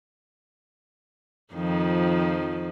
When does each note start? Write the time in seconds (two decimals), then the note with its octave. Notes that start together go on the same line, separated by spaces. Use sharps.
1.54 F2 D#3 F3